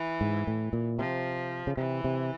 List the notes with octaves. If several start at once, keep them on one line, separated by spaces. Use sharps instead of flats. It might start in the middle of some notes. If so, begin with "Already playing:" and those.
Already playing: E3
G#2
A2
A#2
C3 F3
C#3
C3 E3
C3